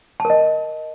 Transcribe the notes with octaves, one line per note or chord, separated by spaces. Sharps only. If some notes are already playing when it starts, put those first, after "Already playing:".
A5
A#4
D#5